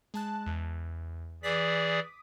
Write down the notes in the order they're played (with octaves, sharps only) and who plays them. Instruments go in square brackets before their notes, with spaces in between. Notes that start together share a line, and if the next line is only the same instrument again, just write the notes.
[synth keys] G#3 A5 F#6
E2
[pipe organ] E3 G#4 D5 [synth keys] D6 D#6 B6